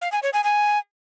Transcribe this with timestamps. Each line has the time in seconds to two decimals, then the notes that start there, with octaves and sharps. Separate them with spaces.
0.01 F5
0.12 G#5
0.23 C#5
0.33 G#5
0.44 G#5